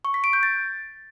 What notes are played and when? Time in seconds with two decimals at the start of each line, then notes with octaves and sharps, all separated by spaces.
0.05 C#6
0.14 B6
0.24 D7
0.33 G6
0.43 A6